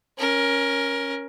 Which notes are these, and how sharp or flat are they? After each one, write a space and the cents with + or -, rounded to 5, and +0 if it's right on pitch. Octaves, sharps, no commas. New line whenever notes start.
C#4 +0 A#4 +15